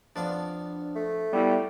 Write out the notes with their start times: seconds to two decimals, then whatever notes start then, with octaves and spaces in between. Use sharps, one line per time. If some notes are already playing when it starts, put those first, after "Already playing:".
0.16 F2 B3 D4 F4
0.96 A3
1.33 G3 B3 E4